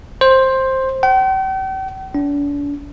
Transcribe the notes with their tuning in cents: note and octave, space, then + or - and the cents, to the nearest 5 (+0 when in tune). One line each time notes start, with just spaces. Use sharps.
C5 +10
G5 -45
D4 -40